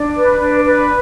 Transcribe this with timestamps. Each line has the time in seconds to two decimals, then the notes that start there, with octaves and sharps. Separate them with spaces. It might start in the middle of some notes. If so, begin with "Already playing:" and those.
Already playing: D4
0.15 B4
0.40 D4
0.65 B4